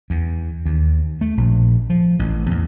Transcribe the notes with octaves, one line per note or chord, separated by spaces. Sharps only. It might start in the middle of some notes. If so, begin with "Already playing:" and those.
E2
D#2
A3
A#1
F3
A1
E2